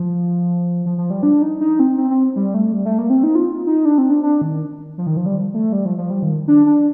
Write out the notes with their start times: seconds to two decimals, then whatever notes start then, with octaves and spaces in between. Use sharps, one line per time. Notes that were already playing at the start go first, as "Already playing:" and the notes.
Already playing: F3
0.86 F3
0.98 F3
1.10 G3
1.23 D4
1.42 D#4
1.61 D#4
1.79 C4
1.98 C4
2.10 C4
2.36 G3
2.54 A3
2.73 G3
2.86 A3
2.98 A#3
3.10 C4
3.23 D#4
3.35 F4
3.66 D#4
3.85 D4
3.98 C4
4.10 D4
4.23 D4
4.42 D#3
4.98 F3
5.07 D#3
5.17 F3
5.26 G3
5.54 A3
5.72 G3
5.86 F3
5.98 F3
6.10 G3
6.23 D#3
6.48 D4
6.66 D4